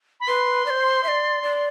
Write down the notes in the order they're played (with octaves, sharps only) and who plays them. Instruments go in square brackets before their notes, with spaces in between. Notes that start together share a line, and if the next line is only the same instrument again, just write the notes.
[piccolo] B5
[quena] B4 [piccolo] C6
[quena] D5
C5
E5
D5
D5